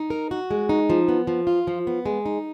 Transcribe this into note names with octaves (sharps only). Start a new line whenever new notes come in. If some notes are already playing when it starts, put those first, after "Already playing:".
Already playing: D#4
A#4
F#4
G#3
D#4
F3
B3
F3
F4
F3
B3
G#3
D#4